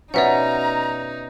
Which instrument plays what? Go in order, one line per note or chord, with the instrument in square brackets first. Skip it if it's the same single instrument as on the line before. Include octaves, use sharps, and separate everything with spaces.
[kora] B2 C#4 [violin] D#4 [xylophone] D5 E5 F#5 [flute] A#5